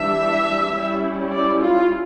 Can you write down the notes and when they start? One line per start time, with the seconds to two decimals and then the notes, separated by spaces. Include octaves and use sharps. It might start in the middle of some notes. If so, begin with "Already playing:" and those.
Already playing: E3 G3 D4 E5
0.72 G3 C#4 E4
1.30 D5
1.59 F4